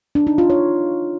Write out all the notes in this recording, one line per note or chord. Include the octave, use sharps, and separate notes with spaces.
D4
D#4
F4
C#5